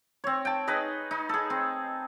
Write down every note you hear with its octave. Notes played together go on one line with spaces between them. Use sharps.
C4 C#5
G5 A5
D#4 G#4 B4 D#5
D#4
G#4 A4
C4